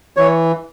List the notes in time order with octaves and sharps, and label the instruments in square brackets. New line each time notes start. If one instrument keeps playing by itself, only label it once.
[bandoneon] E3 C#5